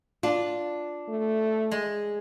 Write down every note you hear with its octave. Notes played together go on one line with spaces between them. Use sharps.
D4 F4
A3
G#3